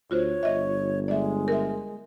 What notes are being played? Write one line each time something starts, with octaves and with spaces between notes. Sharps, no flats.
D2 F4 F#4 C5 C#5
G1 D#5 E5
G#3 D5 E5
A#4 E5